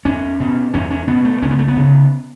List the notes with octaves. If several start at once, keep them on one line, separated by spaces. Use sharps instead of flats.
E2 C#4
B2
E2 C#4
C#4
B2 B3
A3
C#2 C#4
B3
A3
B3
C#3